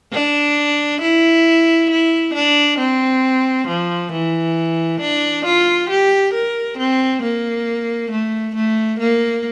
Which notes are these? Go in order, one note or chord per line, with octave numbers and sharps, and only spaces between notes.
D4
E4
E4
D4
C4
F3
E3
D4
F4
G4
A#4
C4
A#3
A3
A3
A#3